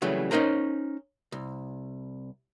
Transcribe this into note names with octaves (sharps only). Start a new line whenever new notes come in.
C#3 E3 F#3 G3 A3
C#4 D#4 A#4 C5 A#5
C2